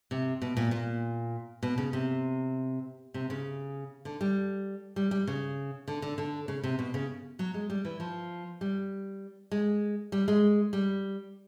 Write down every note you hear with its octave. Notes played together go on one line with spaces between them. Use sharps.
C3
B2
A#2
A#2
B2
C#3
C3
C3
C#3
D3
G3
G3
G3
C#3
D3
D3
D3
C#3
C3
B2
C#3
F#3
G#3
G3
E3
F3
G3
G#3
G3
G#3
G3